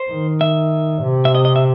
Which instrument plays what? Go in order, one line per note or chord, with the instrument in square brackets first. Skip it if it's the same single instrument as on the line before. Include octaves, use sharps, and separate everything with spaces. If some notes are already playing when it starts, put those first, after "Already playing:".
Already playing: [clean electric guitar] C5
[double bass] D#3
[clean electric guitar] E5
[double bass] C3
[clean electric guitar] E5
D#5
D#5
E5